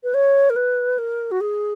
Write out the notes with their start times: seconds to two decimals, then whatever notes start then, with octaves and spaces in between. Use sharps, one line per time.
0.03 B4
0.14 C#5
0.50 A#4
0.56 B4
0.98 A#4
1.31 F#4
1.40 G#4